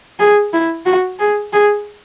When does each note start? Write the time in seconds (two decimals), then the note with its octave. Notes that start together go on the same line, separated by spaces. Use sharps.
0.20 G#4
0.53 E4
0.86 F#4
1.19 G#4
1.53 G#4